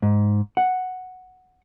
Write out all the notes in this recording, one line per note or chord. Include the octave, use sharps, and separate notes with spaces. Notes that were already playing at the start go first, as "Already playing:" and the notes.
G#2
F#5